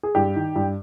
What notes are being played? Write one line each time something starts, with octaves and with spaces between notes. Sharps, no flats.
G#4
G2 G4
D#3
G2